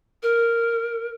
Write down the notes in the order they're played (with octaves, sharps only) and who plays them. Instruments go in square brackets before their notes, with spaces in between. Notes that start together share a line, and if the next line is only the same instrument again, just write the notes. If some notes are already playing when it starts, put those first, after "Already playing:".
[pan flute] A#4